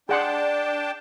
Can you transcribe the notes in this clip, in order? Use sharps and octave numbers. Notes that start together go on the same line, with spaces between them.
D4 G#4 D5 F#5 G5 A5 C6